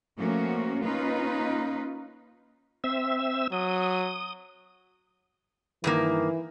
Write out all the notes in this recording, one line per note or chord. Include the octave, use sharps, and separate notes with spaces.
F3 A3 A#3 C#4 F#4
A#3 C#4 D#4 F4 B4
C4 E5 E6
F#3 D#6
G2 D#3 E3 A#3